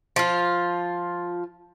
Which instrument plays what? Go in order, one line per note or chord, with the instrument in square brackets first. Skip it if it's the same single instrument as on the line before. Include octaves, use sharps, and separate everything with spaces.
[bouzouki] F3 F4